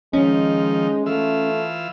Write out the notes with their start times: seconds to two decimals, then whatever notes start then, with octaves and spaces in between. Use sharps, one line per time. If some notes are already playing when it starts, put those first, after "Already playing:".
0.13 D#3 F3 G#3 C#4 D#4
1.06 E3 A3 F4 E6